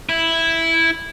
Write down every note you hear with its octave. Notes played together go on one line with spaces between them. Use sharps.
E4